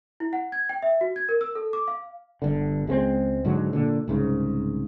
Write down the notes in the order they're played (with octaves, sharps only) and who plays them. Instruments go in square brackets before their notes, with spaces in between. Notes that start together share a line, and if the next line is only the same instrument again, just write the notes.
[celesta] E4
F#5
G#6
G5
E5
F#4
G#6
A#4
E6
A4
D6
F5
[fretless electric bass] G1 D3
C#2 G#3 A3 C4
G#2 D3 F#3 G#3
A#2 D3
C2 G#2 C#3